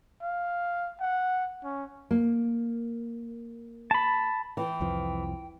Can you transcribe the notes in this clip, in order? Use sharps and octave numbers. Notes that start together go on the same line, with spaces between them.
F5
F#5
C#4
A#3
A5 B5
E3 G5
C2 F2 F3